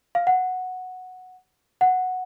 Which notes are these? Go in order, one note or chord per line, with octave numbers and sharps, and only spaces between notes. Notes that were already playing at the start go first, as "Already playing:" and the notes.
F5
F#5
F#5